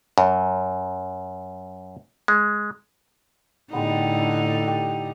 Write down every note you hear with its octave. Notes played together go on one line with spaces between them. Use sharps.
F#2
G#3
A2 D3 G3 G#3 B3 D#4
D4
G4